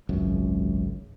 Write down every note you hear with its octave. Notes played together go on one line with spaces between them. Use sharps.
G#1 C#2 F#2